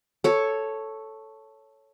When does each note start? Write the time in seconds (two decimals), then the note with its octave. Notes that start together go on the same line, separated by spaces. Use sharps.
0.24 A4 C#5